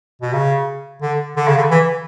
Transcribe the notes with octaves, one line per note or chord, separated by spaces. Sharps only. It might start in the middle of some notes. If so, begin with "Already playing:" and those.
B2
C#3
D3
D3
C#3
D3
E3